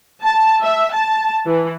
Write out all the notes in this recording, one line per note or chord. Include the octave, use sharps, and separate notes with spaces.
A5
E5
A5
E3